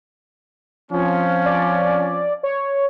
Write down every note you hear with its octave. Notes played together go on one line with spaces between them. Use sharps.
F3 C4 C#4
D5
C#5